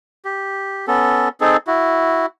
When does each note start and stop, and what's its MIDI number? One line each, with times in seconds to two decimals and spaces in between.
0.25 0.86 67
0.88 1.29 59
0.88 1.29 61
0.88 1.29 69
1.41 1.57 60
1.41 1.57 63
1.41 1.57 68
1.41 1.57 69
1.67 2.26 64
1.67 2.26 66